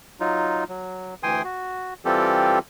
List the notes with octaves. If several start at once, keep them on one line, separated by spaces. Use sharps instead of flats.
F#3 D#4 F4
F#3
D2 E3 G5 G#5 C6 D#6
F#4
E3 G3 C4 F4 G4 A4